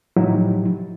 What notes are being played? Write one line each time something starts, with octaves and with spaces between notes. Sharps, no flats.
A2 F3 F#3 D#4 E4 G4